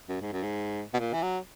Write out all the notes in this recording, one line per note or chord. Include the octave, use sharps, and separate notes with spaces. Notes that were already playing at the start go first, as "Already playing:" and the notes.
F#2
G#2
F#2
G#2
B2
A#2
E3
F#3